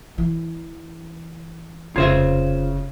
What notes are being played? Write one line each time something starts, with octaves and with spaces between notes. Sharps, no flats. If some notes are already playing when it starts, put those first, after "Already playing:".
E3
F1 C#3 F4 C5 E5 G#6